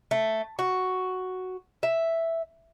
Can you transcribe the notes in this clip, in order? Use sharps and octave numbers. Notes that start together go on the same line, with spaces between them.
A3
F#4
E5